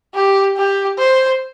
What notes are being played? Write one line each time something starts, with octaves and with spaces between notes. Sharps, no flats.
G4
G4
C5